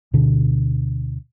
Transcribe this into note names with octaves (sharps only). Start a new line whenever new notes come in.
D2 B2 D3